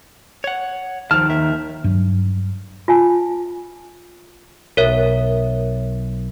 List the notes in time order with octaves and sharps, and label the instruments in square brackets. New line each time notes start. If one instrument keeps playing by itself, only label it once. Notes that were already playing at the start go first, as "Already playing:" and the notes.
[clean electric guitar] C#5 F#5
[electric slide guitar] D#3 [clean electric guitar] F3 A5 [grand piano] F6
[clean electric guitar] D#2 E5
[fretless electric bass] G2 F#3
[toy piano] F4 G#5 A5
[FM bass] B1 [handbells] A#4 C#5 E5